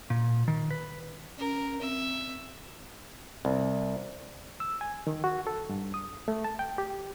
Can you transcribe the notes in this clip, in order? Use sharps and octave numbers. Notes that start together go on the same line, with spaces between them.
A#2
D#3
B4
C#4 A#4
C4 E5
C2
E6
G#5
D#3
F#4
A4
G2
D#6
A3
A5
G5
G4